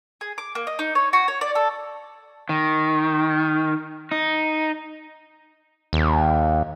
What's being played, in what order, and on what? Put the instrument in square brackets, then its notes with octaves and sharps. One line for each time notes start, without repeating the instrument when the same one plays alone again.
[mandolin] G#4
D6
A#3
D#5
D#4
C#5
F#4
C#5
D5
A4
[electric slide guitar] D#3
D#4
[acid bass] D#2